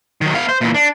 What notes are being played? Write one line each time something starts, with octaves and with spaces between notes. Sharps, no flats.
D#3 F#3
B3 F5
C5
A#2 E3
D4